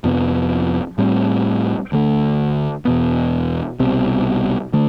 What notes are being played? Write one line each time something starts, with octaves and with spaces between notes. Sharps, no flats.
F2 C3 F3 B3
A2 G3 C4
D2 D3 A3
E2 B2 B3
C2 B2 G3 C4
D3 A3